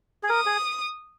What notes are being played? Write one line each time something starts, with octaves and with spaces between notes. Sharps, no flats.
G#4
A#4 D#6
G#4